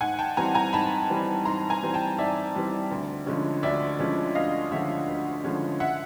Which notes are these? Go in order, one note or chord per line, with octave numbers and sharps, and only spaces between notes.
G#2 F#5 G#5
G5 A5
E3 G3 C4 G#5 A#5
G#5 A#5
G#2 A5 B5
E3 G3 C4
G#2 A#5 C6
G#5 A#5
E3 G3 C4
G5 A5
G#2 D5 E5
E3 G3 C4
D2
D3 F3 G#3 C#4
D2 D5 E5
D3 F3 G#3 C#4
D2 D#5 F5
D3 F3 G#3 C#4 E5 F#5
D2
D3 F3 G#3 C#4
E5 F#5